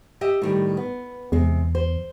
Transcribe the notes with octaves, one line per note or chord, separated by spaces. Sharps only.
G4 D#5 E5
A2 D#3 G3
B3
E2 C3 G#3
C5